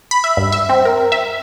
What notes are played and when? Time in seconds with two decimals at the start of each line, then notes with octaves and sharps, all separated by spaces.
0.11 B5
0.24 E5
0.37 G2
0.52 E5
0.69 C4
0.85 A#4
1.12 E5